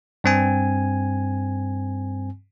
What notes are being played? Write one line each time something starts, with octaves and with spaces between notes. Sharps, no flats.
G2 C4 G#5